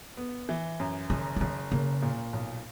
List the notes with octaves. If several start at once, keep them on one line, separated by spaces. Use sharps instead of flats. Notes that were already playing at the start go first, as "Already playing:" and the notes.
B3
E3
F#2
F#1 D#3
E3
F#1 D#3
C#3 A#3
A#2
B1